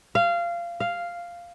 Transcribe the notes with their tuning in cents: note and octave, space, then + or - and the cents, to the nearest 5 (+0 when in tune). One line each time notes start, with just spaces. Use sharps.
F5 -20
F5 -5